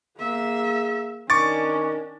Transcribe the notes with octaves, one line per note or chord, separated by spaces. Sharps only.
A#3 G#4 E5
D#3 C#4 D4 C#6 D6 A6